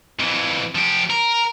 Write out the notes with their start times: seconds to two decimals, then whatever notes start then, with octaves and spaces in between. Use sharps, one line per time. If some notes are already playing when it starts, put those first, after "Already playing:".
0.19 F2 E3
0.75 F3 G4
1.10 A#4